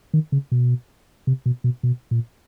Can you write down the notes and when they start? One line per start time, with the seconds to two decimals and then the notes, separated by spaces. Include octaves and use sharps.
0.14 D#3
0.32 C#3
0.52 B2
1.27 C3
1.46 B2
1.64 B2
1.83 B2
2.11 A#2